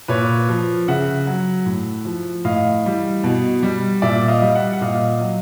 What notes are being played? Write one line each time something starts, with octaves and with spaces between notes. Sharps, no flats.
A#2 B4 C#5
F3
C#3 E5 F#5
F#3
A2
F3
A2 D#5 F5
E3 G3
B2
G3
A#2 D5 E5
D#5 F5
G3
E5 F#5
F#5
A#2 D#5 F5
F#3